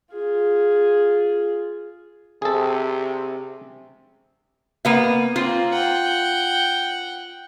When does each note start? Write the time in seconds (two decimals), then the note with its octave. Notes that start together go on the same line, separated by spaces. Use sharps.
0.14 F4 G#4
2.42 C3 G#4 A4
4.85 A#3 B3 F5
5.36 A#3 C4 F4
5.73 F#5 G5